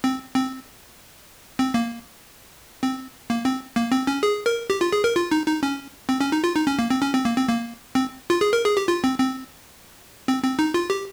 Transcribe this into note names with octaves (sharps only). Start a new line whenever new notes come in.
C4
C4
C4
A#3
C4
A#3
C4
A#3
C4
C#4
G#4
A#4
G4
F4
G#4
A#4
F4
D#4
D#4
C#4
C4
C#4
D#4
F4
D#4
C#4
A#3
C4
C#4
C4
A#3
C4
A#3
C4
F4
G#4
A#4
G#4
G4
F4
C4
C4
C4
C4
D#4
F4
G4